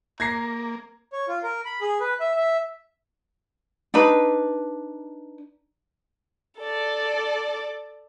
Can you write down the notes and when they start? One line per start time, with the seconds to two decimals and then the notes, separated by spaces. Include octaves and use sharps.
0.20 A#3 A#5 G#6 A#6 C7
1.13 C#5
1.28 F4
1.43 A#4
1.65 B5
1.81 G#4
2.00 B4
2.20 E5
2.36 E5
3.94 D4 D#4 B4
6.59 A4 D5